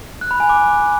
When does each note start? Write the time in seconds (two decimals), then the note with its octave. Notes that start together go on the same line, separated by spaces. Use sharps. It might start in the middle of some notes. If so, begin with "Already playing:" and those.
0.21 F#6
0.31 B5
0.40 G#5
0.49 D6